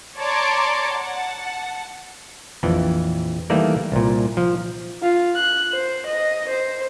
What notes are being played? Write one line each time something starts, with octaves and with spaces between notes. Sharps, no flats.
C#5 D5 A5 A#5 C6 D6
F#5 A5
A#1 F2 E3
D#3 E3 G3 A3 A#3 D5
C2 A#2
F3
F4
F#6
C5
D#5
C5